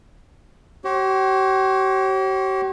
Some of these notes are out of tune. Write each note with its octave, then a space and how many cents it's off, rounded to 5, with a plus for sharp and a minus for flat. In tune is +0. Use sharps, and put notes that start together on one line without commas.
G4 -45 C#5 -35